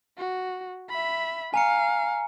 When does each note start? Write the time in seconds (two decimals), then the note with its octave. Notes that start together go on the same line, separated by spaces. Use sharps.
0.18 F#4
0.90 E5 B5
1.54 F5 G#5 A#5 C#7